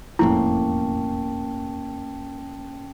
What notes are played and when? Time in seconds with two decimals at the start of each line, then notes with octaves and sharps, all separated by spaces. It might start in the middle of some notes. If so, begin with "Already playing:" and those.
0.19 E1 F2 A2 A#3 C#4 E4 G5 A5